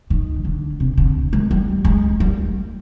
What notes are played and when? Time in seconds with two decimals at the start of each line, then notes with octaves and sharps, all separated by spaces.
0.10 D#3
0.44 D3
0.80 C3
0.98 D3
1.33 G#3
1.51 G3
1.85 G#3
2.20 G3